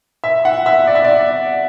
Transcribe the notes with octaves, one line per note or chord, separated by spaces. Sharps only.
E5
F#5
E5
D5
E5
D5